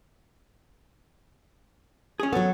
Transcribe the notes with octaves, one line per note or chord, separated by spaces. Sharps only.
C#4 G#4
F#3 B3 A4 C#5